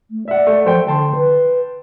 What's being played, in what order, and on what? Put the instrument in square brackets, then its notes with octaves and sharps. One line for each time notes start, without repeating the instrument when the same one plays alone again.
[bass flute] A3
[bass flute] D5 [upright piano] E5 F#5
[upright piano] A3
[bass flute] F3 [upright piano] A3 C5 G5
[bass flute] D3 [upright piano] G5 A5 C6
[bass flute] B4